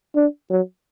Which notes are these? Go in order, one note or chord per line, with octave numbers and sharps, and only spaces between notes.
D4
F#3